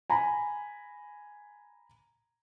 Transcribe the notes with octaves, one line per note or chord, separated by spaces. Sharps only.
G#5 A#5 B5